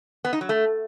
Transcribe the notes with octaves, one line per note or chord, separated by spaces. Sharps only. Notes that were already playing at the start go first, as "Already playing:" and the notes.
B3
D#4
F#3
A3